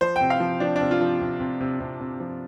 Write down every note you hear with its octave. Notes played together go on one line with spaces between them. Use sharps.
F3 C5
G5
C3
F5
F3
F3 D4
C3 D4
F4
F3
C3
C3
C3
C3
C3
F3